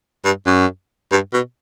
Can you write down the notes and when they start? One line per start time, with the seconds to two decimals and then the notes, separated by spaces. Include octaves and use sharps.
0.25 G2
0.46 F#2
1.12 G2
1.33 B2